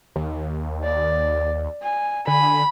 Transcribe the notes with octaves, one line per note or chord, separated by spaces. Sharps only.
D#2
D5
G#5
D3 G#5 B5